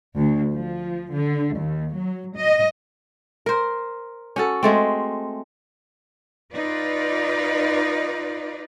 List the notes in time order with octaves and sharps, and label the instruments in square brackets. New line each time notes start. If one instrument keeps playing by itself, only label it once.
[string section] D2
F3
D3
D#2
F#3
D#5
[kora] A#4 C5
C#4 F#4 A4
G#3 A3 C4
[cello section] D#4 F4 B4 D5